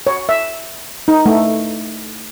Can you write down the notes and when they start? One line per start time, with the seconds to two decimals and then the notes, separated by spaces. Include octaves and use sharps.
0.07 C#5
0.29 E5
1.08 D#4
1.26 A3